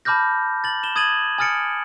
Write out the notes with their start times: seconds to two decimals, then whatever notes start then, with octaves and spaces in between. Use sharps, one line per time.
0.05 A5 B5 D6 F6 G6 A#6
0.64 A6 F#7
0.83 E7 G7
0.96 D#6 G#6 A6 D#7 F#7
1.38 G#5 D#6 F6 A6 C#7 D7